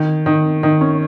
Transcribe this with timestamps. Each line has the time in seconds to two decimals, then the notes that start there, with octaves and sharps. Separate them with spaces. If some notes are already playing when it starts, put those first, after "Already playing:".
Already playing: D#3
0.26 D#3
0.63 D#3
0.81 C#4